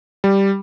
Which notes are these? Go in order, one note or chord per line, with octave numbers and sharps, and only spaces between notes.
G3